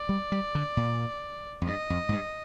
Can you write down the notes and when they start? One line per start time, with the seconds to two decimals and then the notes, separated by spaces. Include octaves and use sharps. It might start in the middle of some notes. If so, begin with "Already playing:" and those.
Already playing: D5
0.09 G3
0.32 G3
0.55 D3
0.77 A#2
1.62 F2
1.67 G2 D#5
1.90 F2
2.09 G#2
2.12 G2